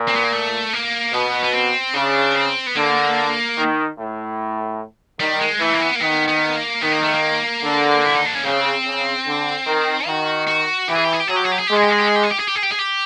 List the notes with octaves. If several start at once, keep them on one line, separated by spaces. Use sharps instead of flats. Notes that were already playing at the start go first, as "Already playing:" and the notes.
Already playing: A#2
C4
B3
A#3
A3
A#3
B2 B3
B3
C4
C#3 D4
C4
B3
D3 A#3
D#3
A2
D#3 G3
G#3
E3 A3
A#3
B3
A#3
D#3 B3
B3
A#3
D#3 B3
A#3
A3
A#3
D3
E4
D#4
D4
C#4
C#3 C4
C#3
D3
D#3
D#3 F#4
F#4
E3 G4
G#4
G4
G#4
G4
F#3 G#4
G4
G#4
G4
G#4
G#3 G4
G#4
G4
G#4
G4
G#4
G4
G#4
G4
G#4
G4
G#4
G4
G#4
G4